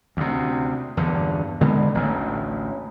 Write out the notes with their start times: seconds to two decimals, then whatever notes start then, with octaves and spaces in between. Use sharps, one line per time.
0.17 D2 C3
0.97 E2 G2 D3
1.61 D3 G#3 B3
1.95 A1 D2